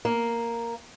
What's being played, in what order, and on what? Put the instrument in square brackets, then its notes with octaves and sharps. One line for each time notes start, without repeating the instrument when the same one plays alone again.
[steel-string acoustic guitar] A#3